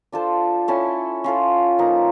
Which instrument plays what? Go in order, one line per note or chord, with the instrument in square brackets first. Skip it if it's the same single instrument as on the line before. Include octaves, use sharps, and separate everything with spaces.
[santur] D4 F4 A4 C5
C#4 E4 A4
C#4 F4 A4
F3 A#3 D#4